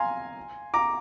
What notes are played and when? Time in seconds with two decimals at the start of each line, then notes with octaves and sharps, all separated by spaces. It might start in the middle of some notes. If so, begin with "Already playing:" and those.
Already playing: F5 G#5 A#5 C6
0.74 A#5 D6